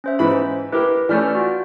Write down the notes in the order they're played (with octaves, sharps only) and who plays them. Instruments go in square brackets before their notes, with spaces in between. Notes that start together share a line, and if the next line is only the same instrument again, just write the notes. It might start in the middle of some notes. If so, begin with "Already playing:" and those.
[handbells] C#4 C5 E5
[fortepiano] G#2 E3 B5
[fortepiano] E4 G4 A#4 [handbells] B4
[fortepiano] E3 A3 C#4 [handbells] D5 F6 G6
[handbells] F4 F#4